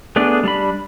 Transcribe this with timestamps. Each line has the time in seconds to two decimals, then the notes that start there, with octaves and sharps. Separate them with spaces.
0.16 A3 B3 D4 G#4 D5
0.43 G3 D4 B5